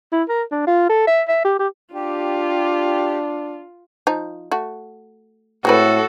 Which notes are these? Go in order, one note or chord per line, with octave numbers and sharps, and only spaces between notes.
E4
A#4
D4
F4
A4
E5
E5
G4
G4
D4 F4 G4
F3 D#4
A3 F#4
A2 G#3 C4 F#4 A4 B4